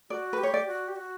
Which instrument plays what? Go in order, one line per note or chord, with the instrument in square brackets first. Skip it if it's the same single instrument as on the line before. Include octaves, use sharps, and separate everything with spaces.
[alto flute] F#4 [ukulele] D5
[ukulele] B4
[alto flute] G4
[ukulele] C#5
D5
[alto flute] F#4
G4
F#4